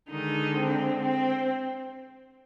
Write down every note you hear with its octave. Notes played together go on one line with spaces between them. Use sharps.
D3 D#3 G#3 D#4
C4
C4